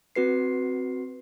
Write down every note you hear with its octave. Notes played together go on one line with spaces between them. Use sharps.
C4 F#4 B4 C7